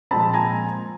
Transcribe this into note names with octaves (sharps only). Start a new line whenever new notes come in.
A#2 F3 G#3 C4 A5 B5
G#5 A#5